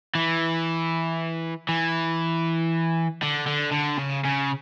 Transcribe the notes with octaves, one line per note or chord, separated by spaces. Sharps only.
E3
E3
D3
D3
D3
C#3
C#3